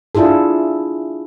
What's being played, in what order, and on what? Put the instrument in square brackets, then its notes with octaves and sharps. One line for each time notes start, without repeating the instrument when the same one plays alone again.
[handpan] D4 E4 F4 G#4 A4